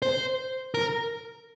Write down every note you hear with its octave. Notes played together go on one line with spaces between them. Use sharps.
C5
A#4